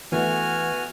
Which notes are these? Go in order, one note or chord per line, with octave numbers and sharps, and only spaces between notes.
E3 A3 B3 F#4 G#5 F6